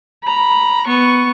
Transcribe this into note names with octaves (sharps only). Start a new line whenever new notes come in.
A#5 B5
B3 C#6